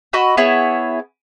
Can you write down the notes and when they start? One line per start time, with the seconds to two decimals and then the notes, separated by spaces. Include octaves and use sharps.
0.13 F#4 D#5 B5 E6
0.37 B3 E4 G#4 C#5